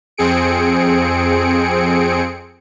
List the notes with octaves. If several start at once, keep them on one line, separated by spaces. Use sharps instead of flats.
F2 C4 G#4 C#7 D7